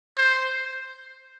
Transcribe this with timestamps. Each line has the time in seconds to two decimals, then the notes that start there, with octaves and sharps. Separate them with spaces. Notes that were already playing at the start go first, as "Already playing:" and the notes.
0.18 C5